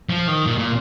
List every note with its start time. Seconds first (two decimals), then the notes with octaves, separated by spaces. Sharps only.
0.10 F3
0.28 D#3
0.46 A#2
0.59 A#2